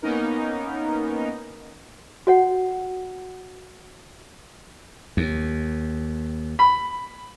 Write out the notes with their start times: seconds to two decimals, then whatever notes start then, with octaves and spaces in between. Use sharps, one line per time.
0.02 A#3 B3 C#4 D#4 A#4
2.27 F#4 C#5 F#5
5.17 D#2
6.59 B5